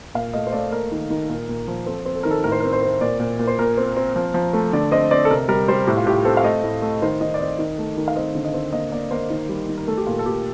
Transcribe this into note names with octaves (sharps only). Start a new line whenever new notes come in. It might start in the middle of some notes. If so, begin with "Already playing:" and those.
A#2 F5
A3 D#5
C5
A3 D5
A#3 A#4
D#3
D#3
A#2
A#2
F3
C4 A4
C4
A4
D#3 A#4
A4
A2 A#4
C5
C4 A#4
C5
C4
A#2 D5
A#2
A#2
C5
A#2 A#4
C4
C4
F3
F3
A3
D3 D5
C4 D#5
C4 D5
A4
C3 A#4
G3 A#4
G3 C5
A2 G4
F4
A2 G4
C4 A4
F5
A3 D#5
A2
A3
D#3 C5
D#3 D#5
D5
C4 D#5
D#3
A3
D#3
F5
C4 D#5
D3
D#5
C4
A#3 D#5
A#3 D5
A#3 C5
D#3
G3
D#3
A#4
A3 A4
G4
A#2 F4
A4
A#2 G4